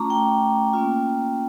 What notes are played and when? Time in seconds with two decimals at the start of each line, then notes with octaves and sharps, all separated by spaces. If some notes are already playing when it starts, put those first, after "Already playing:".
Already playing: A3 C#4 F4 A#5 C#6 D6
0.10 G5
0.73 A#3 C#4 F4